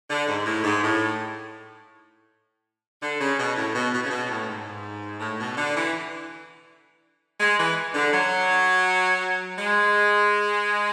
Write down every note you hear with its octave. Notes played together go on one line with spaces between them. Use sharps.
D3
G#2
A2
G#2
A2
D3
C#3
B2
A2
B2
B2
C#3
B2
A2
G#2
A2
B2
D3
E3
G#3
E3
D3
F#3
G#3